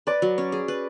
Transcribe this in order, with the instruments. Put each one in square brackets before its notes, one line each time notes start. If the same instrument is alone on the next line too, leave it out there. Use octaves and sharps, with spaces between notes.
[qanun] B4 [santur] D5
[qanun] F#3
C#4
G#4
B4